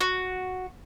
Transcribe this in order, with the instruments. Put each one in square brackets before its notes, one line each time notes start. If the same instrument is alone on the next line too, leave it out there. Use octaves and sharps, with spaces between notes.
[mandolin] F#4